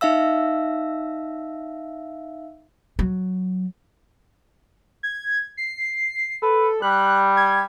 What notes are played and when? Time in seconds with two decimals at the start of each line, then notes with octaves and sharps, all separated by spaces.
0.01 D#4 E5 F5 E6
2.99 F#3
5.03 G#6
5.57 C7
6.42 A4 B4
6.82 G3 F#6
7.37 G#6